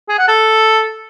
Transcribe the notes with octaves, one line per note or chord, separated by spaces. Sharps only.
G#4
F#5
A4